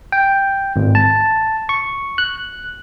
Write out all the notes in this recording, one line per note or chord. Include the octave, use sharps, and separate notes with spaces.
G5
G#1
A5
C#6
F#6